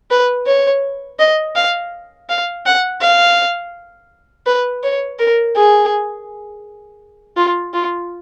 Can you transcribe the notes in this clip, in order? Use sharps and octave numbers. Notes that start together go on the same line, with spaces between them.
B4
C#5
D#5
F5
F5
F#5
F5
B4
C#5
A#4
G#4
F4
F4